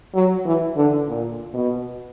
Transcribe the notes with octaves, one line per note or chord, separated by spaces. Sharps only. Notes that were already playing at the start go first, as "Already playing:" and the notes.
F#3
E3
D3
A#2
B2